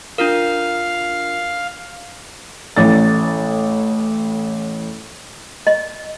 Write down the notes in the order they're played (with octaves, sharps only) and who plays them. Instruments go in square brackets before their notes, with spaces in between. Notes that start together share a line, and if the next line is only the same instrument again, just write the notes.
[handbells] D4 F4 A#4 [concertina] F5
[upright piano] A1 A2 A6
[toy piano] D#5